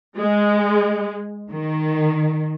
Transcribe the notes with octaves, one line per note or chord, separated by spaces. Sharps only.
G#3
D#3